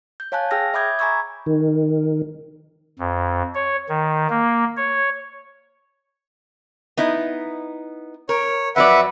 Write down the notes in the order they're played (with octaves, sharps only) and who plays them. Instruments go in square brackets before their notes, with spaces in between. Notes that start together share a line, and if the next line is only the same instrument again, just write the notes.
[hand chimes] G6
C#5 F5 G#5 A5 F#6
G#4 G5 E6 F6 A#6
E5 B5 D6 D#6 G6 G#6
G#5 A#5 B5 C#6 E6 G#6
[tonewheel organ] D#3
[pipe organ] F2
C#5
D#3
A#3
C#5
[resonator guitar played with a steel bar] B3 D#4 E4
[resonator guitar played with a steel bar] A#4 [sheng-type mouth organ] C#5
[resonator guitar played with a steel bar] F2 F#3 D5 [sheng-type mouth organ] B4 E5 F#5